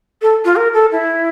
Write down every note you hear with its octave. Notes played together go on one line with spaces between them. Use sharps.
A4
F4
A#4
A4
E4